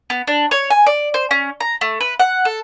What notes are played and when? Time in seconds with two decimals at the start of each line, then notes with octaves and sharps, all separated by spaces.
0.10 B3
0.27 D4
0.51 C#5
0.70 G#5
0.86 D5
1.14 C5
1.31 C#4
1.60 A#5
1.81 A3
2.01 B4
2.20 F#5
2.45 A4